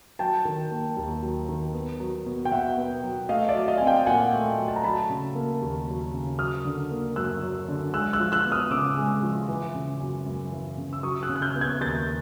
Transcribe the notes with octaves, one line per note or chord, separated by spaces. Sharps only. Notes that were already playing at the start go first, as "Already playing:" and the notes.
F#3 G5 A5
D#3
A#3
D#2
F#3
D#3
B3
F#3
B2
G5
B2 E5 F#5
B3
F#3
A3 D#5 F5
D5 E5
F#3
D#5 F5
C4 G#5
F5 G5
A#2 F#5 G#5
A3
F#3
A5
A#5
F#3 A5 B5
C#3
A#3
D#2
F#3
C#3
F#3 D#6 F6
D3
A#3
F#2 E6 F#6
F#3
D3
G#3 E6 F#6
E6 F#6
F3
E6 F#6
B3
D#6 F6
C#3 D6 E6
G#3
F3
E3
C#3
F#2
F#2
E3
C#3
E6
F#3 C#6 D#6
E6 F#6
C#3
F#6
F6 G6
B3
F#6 G#6
D#2 G6 A6